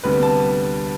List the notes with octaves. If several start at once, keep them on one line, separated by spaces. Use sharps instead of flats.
D2 C3 G3 B3 B4
A5